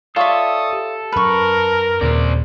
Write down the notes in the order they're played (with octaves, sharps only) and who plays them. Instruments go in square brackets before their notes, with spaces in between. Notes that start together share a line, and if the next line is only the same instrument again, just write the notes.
[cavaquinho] F4 C#5 E5 [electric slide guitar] A4 [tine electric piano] D5 C#6 [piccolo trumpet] D#6
[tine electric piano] G4
[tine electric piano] F#2 F6 [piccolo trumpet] A#4 [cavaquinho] B4 C#6
[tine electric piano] D#2 A#2 C#3 [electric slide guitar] C4 D5